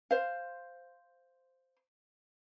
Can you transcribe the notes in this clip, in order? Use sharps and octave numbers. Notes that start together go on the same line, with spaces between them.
C5 F5